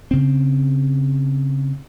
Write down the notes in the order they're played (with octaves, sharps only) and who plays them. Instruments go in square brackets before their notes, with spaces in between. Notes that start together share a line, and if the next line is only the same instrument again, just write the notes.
[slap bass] C#3 C4